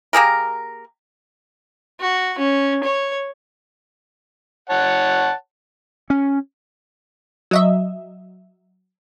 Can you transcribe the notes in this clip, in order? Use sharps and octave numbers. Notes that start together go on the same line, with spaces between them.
A#3 G4 G#4 A#4
F#4
C#4
C#5
C#5 F#5 A5
C#4
F#3 D#5 E5